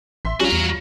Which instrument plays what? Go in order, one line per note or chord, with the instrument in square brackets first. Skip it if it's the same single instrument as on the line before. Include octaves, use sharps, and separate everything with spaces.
[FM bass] A1 [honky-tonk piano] E5 C6 B6
[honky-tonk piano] G3 F4 [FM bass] C#4 [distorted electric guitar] F#4 A#5
[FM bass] E2